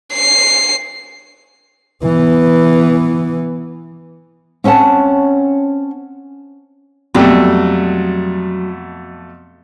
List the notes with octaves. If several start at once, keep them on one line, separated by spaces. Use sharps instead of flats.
C7
E3 B3
C4 C#4 C#5 F#5 A5
F2 B2 F#3 G3 A3 G4